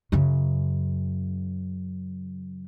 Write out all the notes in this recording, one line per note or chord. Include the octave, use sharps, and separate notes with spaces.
F#2 C#3